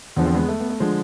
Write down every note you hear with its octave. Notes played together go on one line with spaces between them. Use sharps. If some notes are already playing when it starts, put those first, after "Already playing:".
E2 D3 F3 B3
C4
G#3 B3
A3
B3
A3
D3 F3 G#3